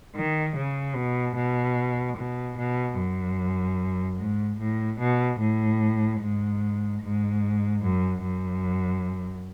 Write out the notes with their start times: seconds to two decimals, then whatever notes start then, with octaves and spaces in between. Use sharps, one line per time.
0.16 D#3
0.56 C#3
0.96 B2
1.36 B2
2.17 B2
2.58 B2
2.99 F#2
4.19 G#2
4.59 A2
5.00 B2
5.40 A2
6.21 G#2
7.02 G#2
7.82 F#2
8.23 F#2